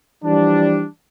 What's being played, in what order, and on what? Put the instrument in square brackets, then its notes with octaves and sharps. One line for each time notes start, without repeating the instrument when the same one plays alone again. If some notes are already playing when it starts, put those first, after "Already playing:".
[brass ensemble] E3 F3 G3 D4